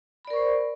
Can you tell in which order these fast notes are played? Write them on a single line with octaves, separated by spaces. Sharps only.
B5 D5 A#4 C#6 C5